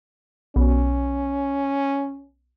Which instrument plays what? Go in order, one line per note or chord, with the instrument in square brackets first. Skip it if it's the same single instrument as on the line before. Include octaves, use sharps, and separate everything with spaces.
[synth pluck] B1 [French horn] C#4